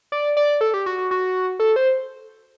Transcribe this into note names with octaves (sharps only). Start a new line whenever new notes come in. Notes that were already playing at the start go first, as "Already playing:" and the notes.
D5
D5
A4
G4
F#4
F#4
F#4
A4
C5